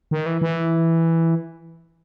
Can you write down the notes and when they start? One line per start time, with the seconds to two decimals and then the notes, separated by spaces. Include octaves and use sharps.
0.11 D#3
0.26 E3
0.42 E3